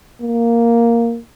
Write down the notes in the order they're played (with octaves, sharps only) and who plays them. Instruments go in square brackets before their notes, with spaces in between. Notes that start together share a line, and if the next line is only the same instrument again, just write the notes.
[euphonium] A#3